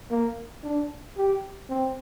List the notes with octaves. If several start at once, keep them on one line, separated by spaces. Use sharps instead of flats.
A#3
D4
G4
C4